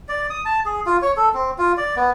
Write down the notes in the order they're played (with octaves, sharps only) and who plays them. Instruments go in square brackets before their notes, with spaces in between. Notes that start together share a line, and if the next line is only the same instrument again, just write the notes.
[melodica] D5
D#6
A5
G#4
F4
C#5
A4
C4
F4
D5
B3